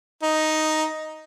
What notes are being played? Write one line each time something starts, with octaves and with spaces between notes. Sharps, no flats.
D#4